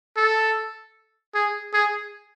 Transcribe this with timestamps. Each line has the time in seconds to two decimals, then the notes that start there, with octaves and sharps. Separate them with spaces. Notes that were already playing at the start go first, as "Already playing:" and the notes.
0.17 A4
1.35 G#4
1.74 G#4